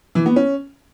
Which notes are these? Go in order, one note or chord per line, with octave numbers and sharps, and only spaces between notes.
E3
B3
C#4